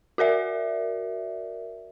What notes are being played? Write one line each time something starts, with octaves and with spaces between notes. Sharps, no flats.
F#4 A#4 D5 E5